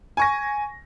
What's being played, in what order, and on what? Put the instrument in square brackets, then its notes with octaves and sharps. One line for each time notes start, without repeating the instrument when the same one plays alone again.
[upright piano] G#5 C#6 A#6